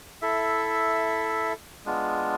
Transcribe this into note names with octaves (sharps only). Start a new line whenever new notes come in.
E4 A4 E5
G#3 B3 D4 F4